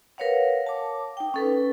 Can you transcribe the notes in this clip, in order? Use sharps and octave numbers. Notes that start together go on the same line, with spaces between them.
A#4 B4 C#5 F5 F#5
A5 D6
D6
D#4 G5
C#4 A4 B4